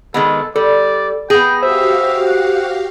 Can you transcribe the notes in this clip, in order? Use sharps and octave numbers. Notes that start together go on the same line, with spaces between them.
D#3 G#3 B3 A4
G3 A4 D5
B3 G#4 G5 A#6
F#4 G4 C5 E5 F5
F#5